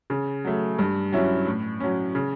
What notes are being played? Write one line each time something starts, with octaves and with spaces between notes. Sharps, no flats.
C#3
F#3 A3
G2
F#3 C#4 E4
A2
F#3 C#4
C#3